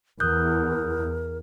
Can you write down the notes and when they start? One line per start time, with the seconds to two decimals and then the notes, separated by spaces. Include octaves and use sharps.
0.20 E2 A#4 D#6 F#6 G6